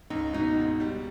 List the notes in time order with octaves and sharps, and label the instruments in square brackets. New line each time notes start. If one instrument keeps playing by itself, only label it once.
[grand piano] C#2 [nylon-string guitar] D#4
[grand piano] B2 [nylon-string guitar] D#4
[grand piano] G#2
G3